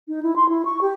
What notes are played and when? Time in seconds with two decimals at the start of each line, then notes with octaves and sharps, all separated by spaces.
0.08 D#4
0.23 E4
0.36 C6
0.49 E4
0.65 C#6
0.81 G4